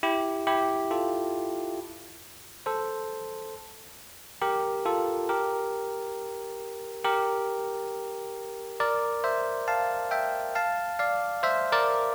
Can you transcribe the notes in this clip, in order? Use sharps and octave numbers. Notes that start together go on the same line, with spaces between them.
E4 G4
E4 G4
F4 A4
A4 C5
G4 A#4
F4 A4
G4 A#4
G4 A#4
A#4 D5
C5 E5
F5 A5
E5 G5
F5 A5
D5 F5
C5 E5
A#4 D5